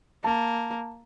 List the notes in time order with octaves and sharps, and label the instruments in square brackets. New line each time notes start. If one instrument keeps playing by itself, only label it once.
[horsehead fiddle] A#3 [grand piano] A5